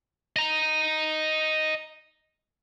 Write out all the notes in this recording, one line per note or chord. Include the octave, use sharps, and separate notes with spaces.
D#5 A#5